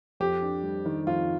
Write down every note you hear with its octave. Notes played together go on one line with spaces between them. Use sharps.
F2 G4
D4
G3
D#3
F2 F4